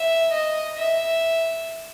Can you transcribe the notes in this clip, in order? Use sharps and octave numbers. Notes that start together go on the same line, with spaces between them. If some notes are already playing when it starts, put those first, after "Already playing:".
Already playing: E5
D#5
E5